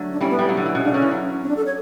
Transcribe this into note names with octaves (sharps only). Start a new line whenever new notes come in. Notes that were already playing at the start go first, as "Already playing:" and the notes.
Already playing: D3 F#3 A3
D4
E3 G3 C#4
B3
E3 G3
F#3
D3
E3
B2 C#4
C#3 D4
D3 C#4
E3
F#3
C#4
D4
A4
C#5